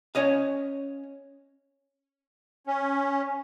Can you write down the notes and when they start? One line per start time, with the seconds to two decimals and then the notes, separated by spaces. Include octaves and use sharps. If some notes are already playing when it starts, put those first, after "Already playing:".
0.15 C#4 C#5 D#5 F5
2.67 C#4